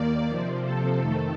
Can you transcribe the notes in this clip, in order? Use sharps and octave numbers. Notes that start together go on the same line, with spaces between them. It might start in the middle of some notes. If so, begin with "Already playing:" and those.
Already playing: D#2 D#3 A#3 D5
C3 F3 C4
A4
F2 D#3 A3